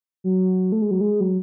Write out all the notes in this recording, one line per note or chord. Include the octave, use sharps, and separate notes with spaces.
F#3
A3
G#3
F#3
G#3
F#3